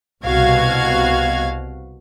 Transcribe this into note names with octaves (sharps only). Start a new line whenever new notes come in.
C2 B2 F#4 F5 G#6